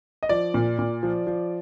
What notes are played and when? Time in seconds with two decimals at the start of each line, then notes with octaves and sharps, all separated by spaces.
0.23 D#5
0.29 F3 D5
0.54 A#2
0.79 A#2
1.03 F3
1.27 F3